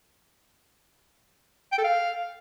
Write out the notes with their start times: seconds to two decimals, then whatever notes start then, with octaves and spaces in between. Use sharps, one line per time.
1.72 G5
1.78 A4
1.84 F5